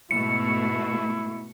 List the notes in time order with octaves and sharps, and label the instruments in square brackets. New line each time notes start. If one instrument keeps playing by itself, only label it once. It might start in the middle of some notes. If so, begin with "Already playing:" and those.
[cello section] G#2 B2 A3 [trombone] E4 [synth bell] C#7